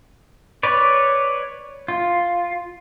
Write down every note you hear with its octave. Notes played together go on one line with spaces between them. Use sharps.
B4 C#5 D5
F4